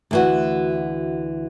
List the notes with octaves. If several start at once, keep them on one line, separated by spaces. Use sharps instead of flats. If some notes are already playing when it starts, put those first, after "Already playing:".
D2 E3 F#4